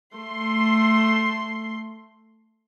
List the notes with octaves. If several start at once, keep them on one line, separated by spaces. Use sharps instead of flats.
A3 C6